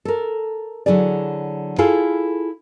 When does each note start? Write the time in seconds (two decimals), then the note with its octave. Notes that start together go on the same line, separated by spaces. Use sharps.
0.05 A4 A#4
0.86 D3 F#3 E4 G#4 D5
1.78 E4 F4 G#4 A4 F5